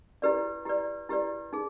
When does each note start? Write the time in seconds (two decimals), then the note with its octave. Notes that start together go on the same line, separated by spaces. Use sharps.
0.22 E4 G4 B4 D5
0.65 E4 G4 B4 D5
1.09 E4 G4 B4 D5
1.53 D#4 G#4